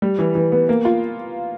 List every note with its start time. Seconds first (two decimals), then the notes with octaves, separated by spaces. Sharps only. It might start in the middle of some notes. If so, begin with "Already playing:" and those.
0.02 G3
0.19 E3
0.35 E3
0.52 B3
0.69 A#3
0.85 F4